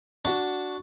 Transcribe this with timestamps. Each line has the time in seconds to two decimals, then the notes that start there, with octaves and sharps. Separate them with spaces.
0.25 D4 F#4 C#6